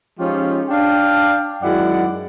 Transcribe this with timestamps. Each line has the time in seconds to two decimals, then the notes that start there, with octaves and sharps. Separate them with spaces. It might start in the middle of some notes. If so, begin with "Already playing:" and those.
0.20 F3 G#3 C#4 D#4 F4 G4
0.69 D4 F5 G5
1.63 F#2 D#3 G#3 E4 D5 F#5